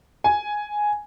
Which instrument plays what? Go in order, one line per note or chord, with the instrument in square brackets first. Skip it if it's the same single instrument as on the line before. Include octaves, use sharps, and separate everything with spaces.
[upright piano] G#5